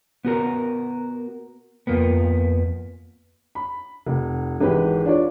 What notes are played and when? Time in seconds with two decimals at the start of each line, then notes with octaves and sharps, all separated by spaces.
0.25 B3 F#4 A#4
1.87 F2 F3 A#3 B3
3.55 B5
4.06 F1
4.60 G#1 E3 G#3 G4 B4
5.05 D4 F4 C#5 D5